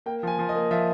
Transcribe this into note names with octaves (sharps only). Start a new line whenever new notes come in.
A#3 G5
F3 G#5
F3
D#5
A#3
F3 E5